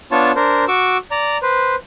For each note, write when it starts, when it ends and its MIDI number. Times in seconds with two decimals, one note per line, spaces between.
0.12 0.32 59
0.12 0.32 62
0.12 0.32 65
0.12 0.32 73
0.12 0.32 81
0.36 0.65 62
0.36 0.65 70
0.36 0.65 72
0.68 0.97 66
0.68 0.97 85
0.68 0.97 86
0.68 0.97 88
1.11 1.38 74
1.11 1.38 82
1.42 1.76 71
1.42 1.76 72